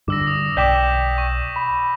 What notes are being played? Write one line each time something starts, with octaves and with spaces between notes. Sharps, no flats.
G2 D3 D6 E6 A#6
D#6
B1 D5 G5 D6 G6 B6 E7
C#6
B5